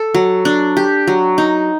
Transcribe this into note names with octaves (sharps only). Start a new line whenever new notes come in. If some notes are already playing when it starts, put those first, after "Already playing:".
Already playing: A4
F#3
D4
G4
F#3
D#4